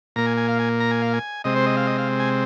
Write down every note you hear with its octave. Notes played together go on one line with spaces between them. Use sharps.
A#2 A#3 A#5
G#5
G#5
F5
G#5
A#5
G#5
F5
G#5
C3 G#3 C4 D#5
C5
D#5
F5
D#5
F5
G#5